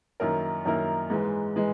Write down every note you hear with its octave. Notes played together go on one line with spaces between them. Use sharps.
F#2 D#3 A#3 E4 A#4
F#2 D#3 A#3 E4 A#4
G#2 E3 G#3
E3 G#3